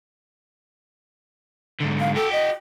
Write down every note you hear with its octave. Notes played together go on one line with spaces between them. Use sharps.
G#2 D3
F5
F#4 A4 G5
D#5